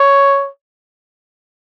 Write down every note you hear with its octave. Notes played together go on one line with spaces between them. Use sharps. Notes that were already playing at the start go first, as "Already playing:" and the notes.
Already playing: C#5